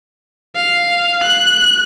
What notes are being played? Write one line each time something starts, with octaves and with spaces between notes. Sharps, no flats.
F5
F#6